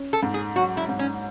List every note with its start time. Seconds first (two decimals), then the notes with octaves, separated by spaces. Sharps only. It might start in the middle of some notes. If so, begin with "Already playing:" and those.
Already playing: C#4
0.13 A4
0.23 G#2
0.34 G#4
0.56 F#3 F#4
0.77 E4
0.89 G#2
0.99 C#4